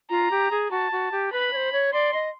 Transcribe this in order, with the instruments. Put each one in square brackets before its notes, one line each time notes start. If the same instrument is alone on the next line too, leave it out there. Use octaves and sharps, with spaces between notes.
[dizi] F4 [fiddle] A#5
[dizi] G4
G#4
[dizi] F#4 [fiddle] A5
[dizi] F#4
G4
[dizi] B4 [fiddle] B5
[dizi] C#5
C5
C#5
[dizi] D5 [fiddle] C6
[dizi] D#5